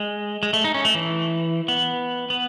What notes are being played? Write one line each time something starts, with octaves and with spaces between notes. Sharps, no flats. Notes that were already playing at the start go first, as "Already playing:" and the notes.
Already playing: G#3
G#3
A3
D#4
C#4
A3
E3
B3
B3